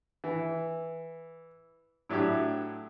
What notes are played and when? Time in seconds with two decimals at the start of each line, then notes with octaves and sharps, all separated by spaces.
0.24 E3
2.09 A2 F#3 D4 E4 G4